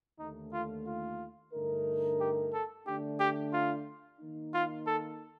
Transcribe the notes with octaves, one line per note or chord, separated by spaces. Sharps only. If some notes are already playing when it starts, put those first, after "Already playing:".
D#2 D3 A3 D#4
F4
F4
G2 D3 A3 D#4 A#4
G4
A4
D3 A3 D4 G4
G4
F4
D#3 A#3 D#4
F4
A4